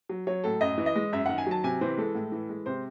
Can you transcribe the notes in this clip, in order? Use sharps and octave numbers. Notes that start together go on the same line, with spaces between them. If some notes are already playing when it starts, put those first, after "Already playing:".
F#3
F#3 C#5
A2 A4
F#2 D#5
E3
D#5
G#3
F#2 E5
D#3 F#5
G#5
F#3 A5
C3 G#5
E3 C5
G#3 A4
A2
E3
G#3
C3 C5